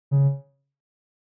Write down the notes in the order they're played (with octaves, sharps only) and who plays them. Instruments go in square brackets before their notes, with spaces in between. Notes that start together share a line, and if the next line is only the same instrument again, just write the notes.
[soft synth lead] C#3